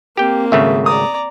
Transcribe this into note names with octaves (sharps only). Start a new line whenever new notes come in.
A#3 C4 G4 G5
G#1 C#3 A3 E5
D5 A#5 D#6